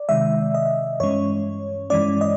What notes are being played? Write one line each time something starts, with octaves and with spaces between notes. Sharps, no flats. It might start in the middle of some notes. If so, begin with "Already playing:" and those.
Already playing: D5
C3 D#3 G#3 E5
D#5
G2 E3 G#3 C#4 C#5
G2 E3 G#3 C#4 D5
D#5